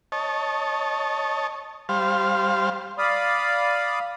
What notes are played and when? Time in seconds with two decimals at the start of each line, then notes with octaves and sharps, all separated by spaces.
0.12 C#5 D#5 A5
1.89 G3 C5 F5
2.98 D5 F5 B5 D#6